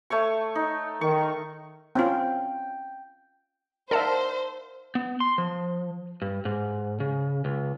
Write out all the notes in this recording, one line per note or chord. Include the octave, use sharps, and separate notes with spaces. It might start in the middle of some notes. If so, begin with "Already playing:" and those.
A3 C#5 C#6
D#4
D#3 C#6
C4 C#4 F4 G5
A#4 C5 D5 E5 F#5 A5
B3
C6
F3
G2
G#2
C#3
C#2